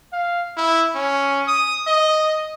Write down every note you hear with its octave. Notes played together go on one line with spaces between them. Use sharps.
F5
E4
C#4
D#6
D#5